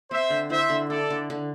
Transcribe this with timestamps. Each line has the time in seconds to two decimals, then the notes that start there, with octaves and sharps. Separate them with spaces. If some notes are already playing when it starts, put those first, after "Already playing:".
0.11 C4 C5 E5
0.30 D3
0.50 E4 C5 E5
0.70 D3
0.90 E4 A4 D5
1.10 D3
1.30 D3